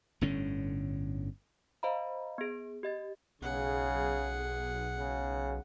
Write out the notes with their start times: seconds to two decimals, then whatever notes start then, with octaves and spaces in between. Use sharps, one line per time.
0.21 G1 A2 D3 C#4
1.83 C5 D#5 F5 A#5 B5
2.38 B3 G#4
2.83 G4 D#5 A6
3.42 B1 C#3 G#4 F#5
4.99 C#3